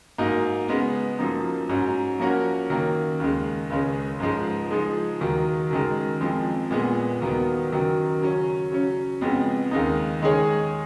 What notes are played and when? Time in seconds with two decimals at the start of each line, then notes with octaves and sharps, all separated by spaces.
0.18 G#2 F#3 A#3 D#4
0.68 C#3 G#3 B3
1.18 F#2 F3 A#3 D#4
1.69 G#2 F#3 C#4
2.20 F3 A#3 C#4 F#4 A#4
2.70 F#2 D#3 A#3
3.20 D#2 C#3 G#3
3.70 C#2 C#3 G#3 C#4
4.20 G#2 F3 G#3
4.70 F3 G#3 D#4 G#4
5.20 D#2 D#3 F#3
5.70 F#2 D#3 G#3
6.21 F2 F3 G#3
6.71 A#2 G#3 B3
7.21 D#2 D#3 F#3 B3
7.72 F#2 D#3 F#3
8.21 C#3 F#3 C#4
8.72 C#3 F#3 C#4
9.21 F2 C#3 G#3 B3
9.71 D#2 C#3 G#3 D#4
10.22 D#3 G#3 D#4 G#4 C#5